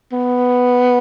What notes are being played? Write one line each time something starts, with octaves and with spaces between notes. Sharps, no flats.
B3